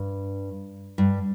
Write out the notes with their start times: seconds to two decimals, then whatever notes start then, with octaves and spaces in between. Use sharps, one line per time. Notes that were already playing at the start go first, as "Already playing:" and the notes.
Already playing: G2
0.98 G2